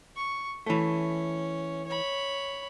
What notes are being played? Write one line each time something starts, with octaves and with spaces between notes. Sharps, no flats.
C#6
E3 A3 C#4
C#5 B5